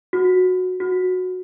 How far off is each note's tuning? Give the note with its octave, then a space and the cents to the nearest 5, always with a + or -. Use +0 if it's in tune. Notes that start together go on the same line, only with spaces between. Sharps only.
F#4 -10
F#4 -10